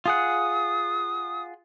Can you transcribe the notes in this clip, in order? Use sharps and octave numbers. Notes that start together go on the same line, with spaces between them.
F4 G#4 F#5 D#6